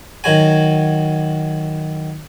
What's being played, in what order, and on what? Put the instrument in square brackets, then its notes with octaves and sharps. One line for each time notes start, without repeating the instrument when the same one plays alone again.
[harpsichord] D#3 F#3 F#4 G#5